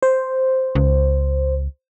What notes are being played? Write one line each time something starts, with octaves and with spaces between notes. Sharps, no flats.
C5
C#2